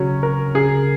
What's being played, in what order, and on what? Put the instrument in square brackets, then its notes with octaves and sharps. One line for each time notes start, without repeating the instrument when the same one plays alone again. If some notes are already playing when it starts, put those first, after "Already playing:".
Already playing: [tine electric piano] C#3 [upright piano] F#3 C#4
[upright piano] A#4
[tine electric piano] C#3 [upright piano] G#4